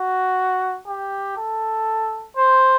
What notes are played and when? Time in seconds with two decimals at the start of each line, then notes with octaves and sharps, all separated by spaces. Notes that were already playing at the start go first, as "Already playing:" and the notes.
Already playing: F#4
0.87 G4
1.37 A4
2.37 C5